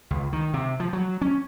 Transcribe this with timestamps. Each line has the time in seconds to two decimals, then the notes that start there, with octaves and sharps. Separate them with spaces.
0.11 C#2
0.33 D#3
0.54 C3
0.80 F3
0.93 F#3
1.22 C#4